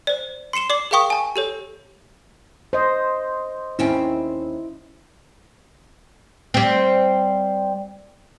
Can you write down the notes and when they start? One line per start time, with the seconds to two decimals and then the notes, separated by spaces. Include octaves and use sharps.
0.07 C5 D5
0.53 C6 C7 C#7 E7 G7
0.70 D5 D6 C7 F#7
0.91 G#4 A#4 F5 G5 C#6 D#6
1.10 G#5 A5
1.36 G4 A4 C#5
2.73 C5 D#5
3.79 D#2 C4 C#4 E4
6.54 G3 C4